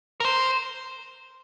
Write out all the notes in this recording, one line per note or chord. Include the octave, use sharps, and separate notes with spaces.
A#4
C5